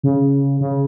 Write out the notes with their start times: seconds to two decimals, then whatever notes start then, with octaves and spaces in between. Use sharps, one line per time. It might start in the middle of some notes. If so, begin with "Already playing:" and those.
0.03 C#3
0.60 C#3